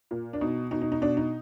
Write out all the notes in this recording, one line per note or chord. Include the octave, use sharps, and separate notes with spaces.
A#2
D4
B2 D#4
B2 D#4
D#4
D#4
B2 D4
D#4